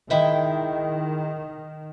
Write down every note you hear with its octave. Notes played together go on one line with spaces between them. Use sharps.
D#3 G#3 E4 G5